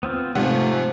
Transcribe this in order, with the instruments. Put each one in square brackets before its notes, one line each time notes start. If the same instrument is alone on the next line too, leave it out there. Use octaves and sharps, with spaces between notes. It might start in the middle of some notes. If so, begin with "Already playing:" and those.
[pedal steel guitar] B3 C4 F4
[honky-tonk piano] G#2 C3 F#5 [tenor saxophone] F3 [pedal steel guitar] A3 G#5